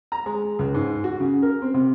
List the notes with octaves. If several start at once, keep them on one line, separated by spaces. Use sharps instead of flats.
A#5
G#3
C#2
G#2
F#4
C#3
A#4
C4
C3